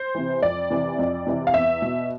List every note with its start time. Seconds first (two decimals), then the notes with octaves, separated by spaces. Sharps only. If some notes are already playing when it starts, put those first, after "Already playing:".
Already playing: C5
0.15 C3 E3
0.42 F2 D5
0.71 C3 E3
0.99 F2
1.27 C3 E3
1.47 F5
1.54 E2 E5
1.82 B2